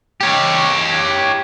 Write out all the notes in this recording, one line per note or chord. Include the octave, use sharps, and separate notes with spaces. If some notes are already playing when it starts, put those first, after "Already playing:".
G4 C#5